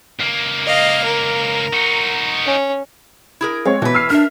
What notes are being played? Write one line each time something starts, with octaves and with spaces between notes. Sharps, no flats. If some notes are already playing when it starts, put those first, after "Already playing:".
C#2 A#3
D#5 F5
A#4
D#4 F#4
C#4
E4 G#4 A#4
G#3 C4 C#5 F5
B2 E3 B4
E6 F6 C7
D4 A#4 E5 F6